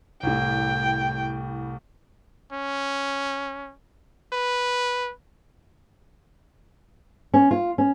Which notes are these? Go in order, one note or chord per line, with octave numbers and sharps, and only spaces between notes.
C2 A2 G5
C#4
B4
C#4
F4
C#4